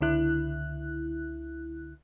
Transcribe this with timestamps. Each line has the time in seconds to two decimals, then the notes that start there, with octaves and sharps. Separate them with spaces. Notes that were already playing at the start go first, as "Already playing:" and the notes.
0.01 C#2 D3 E4 F#6